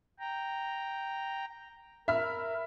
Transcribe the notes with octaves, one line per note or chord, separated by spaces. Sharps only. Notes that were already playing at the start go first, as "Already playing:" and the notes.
G5 A#5
A#4 E5 B5 F6